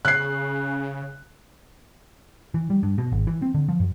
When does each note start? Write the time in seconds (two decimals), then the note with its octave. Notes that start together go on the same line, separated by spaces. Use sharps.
0.05 C#3 F#6 C7
2.54 E3
2.70 G3
2.83 G2
2.98 B2
3.12 G#1
3.27 E3
3.42 C4
3.54 D3
3.69 F3
3.80 F#2